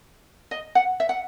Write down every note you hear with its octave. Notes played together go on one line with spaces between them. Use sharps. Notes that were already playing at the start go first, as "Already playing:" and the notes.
D#5
F#5
E5
F#5